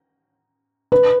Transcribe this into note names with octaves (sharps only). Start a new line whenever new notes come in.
B4